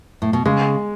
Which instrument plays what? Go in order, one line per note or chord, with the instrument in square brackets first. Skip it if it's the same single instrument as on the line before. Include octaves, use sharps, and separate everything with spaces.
[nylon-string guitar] A2
B2
[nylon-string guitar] C#3 [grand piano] G#3